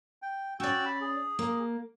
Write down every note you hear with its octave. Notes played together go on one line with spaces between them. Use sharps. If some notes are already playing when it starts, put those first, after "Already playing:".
G5
C#4 F#4 D5 G5 E6
B5
G#4
A#3